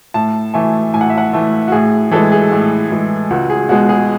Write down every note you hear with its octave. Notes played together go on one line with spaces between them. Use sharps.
A2 A5
E3 A3 G#5
A2 G#5
F#5
E5
F#5
E3 A3
F#4
A2 G#4
E3 G#3 A4
G#4
A2
E3 G#3
C#2 F#4
G#4
B2 G#3 F#4
G#4